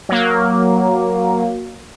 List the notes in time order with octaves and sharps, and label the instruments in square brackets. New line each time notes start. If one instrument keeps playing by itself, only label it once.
[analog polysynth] F#3 A#3